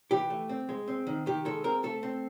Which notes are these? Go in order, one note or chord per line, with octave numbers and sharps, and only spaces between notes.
E3 G4
A3
C4
G#3
C4
D#3
D#3 G4
G#3 A4
C4 A#4
A3 A4
C4